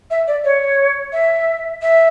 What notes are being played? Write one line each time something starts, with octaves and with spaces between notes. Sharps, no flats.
E5
D5
C#5
E5
E5